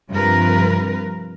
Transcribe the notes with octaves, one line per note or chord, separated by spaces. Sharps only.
G2 C3 F3 A#4 B4